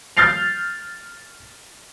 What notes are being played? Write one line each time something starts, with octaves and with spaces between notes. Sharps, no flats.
F6 G6 A6 C7 F7